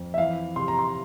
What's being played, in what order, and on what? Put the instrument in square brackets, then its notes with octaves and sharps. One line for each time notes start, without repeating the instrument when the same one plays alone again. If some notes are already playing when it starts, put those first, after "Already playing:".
Already playing: [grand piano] F2
E5
E3 F5
C3 C6
A#5
C6